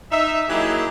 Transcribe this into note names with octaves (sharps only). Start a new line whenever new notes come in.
D#4 E5
F#3 A#3 D#4 E4 G4 G#4